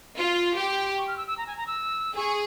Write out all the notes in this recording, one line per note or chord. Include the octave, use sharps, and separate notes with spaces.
F4 C6
G4
C#6
F6
E6
E6
A#5
G#5
A#5
E6
G#4 C#6